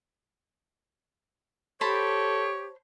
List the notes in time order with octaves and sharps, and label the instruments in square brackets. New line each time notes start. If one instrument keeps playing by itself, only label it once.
[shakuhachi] G4 [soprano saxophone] A4 [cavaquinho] C5 A5 B5 [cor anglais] C#5